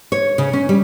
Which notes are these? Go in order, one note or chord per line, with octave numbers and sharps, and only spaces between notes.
C#5
C#3
C#4
G3